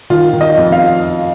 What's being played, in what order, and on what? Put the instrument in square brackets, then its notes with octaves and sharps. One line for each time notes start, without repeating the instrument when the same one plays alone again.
[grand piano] D#3 F4
D#3
D#5
F2
F5